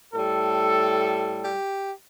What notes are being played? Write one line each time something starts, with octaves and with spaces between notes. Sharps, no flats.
A2 G3 A4
G4